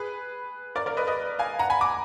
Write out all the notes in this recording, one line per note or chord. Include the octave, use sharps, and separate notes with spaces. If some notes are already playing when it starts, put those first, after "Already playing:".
Already playing: G#4 B4
A#4 D5
A#4 D5
B4 D#5
B4 D#5
F5 G#5
F#5 A#5
G#5 B5
A#5 D6